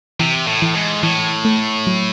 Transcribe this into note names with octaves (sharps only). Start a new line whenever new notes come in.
C3 E3
A2
E3
G#2
A2 E3
A3
F#3